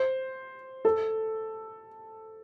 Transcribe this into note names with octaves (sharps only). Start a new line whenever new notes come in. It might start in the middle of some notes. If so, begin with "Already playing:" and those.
Already playing: C5
A4